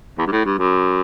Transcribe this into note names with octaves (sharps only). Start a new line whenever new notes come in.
E2
G2
A2
G2
F#2